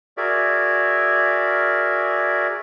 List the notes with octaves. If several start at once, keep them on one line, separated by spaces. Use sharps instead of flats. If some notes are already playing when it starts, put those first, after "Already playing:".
F#4 G#4 A#4 D5 E5